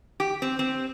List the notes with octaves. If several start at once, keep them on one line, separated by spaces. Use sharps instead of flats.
G4
C4
C4